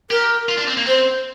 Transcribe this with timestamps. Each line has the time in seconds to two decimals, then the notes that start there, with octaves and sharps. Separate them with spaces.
0.10 G4 A#4
0.49 F4
0.58 D4
0.67 C4
0.77 A#3
0.86 C4 C5